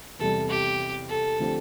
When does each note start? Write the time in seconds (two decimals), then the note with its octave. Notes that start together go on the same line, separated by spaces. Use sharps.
0.19 E2 C3 G3 A4
0.50 G4
1.08 A4
1.39 D3 F3 A3 C4 G4